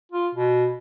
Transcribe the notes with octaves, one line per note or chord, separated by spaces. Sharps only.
F4
B2